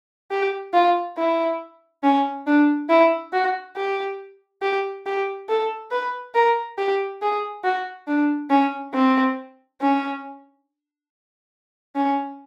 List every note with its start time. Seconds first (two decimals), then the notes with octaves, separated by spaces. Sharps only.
0.31 G4
0.73 F4
1.17 E4
2.03 C#4
2.47 D4
2.89 E4
3.33 F#4
3.76 G4
4.62 G4
5.06 G4
5.49 A4
5.91 B4
6.34 A#4
6.78 G4
7.22 G#4
7.64 F#4
8.07 D4
8.50 C#4
8.94 C4
9.81 C#4
11.95 C#4